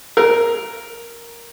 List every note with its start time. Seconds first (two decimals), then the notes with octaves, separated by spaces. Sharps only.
0.17 A#4